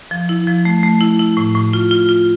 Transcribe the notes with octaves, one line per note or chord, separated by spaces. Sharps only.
F3
E4
F3
A3
A3
E4
E4
A2
A2
F4
F4
F4